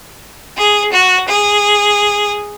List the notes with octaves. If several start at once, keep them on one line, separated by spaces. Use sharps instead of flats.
G#4
F#4
G#4